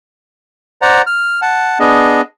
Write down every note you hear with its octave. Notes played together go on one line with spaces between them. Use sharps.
C5 D5 F#5 A#5
F6
F#5 A5
B3 D4 G#4 D#5